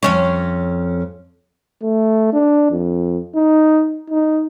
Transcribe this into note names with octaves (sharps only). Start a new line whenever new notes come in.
F2 C#4 C#5
A3
D4
F2
D#4
D#4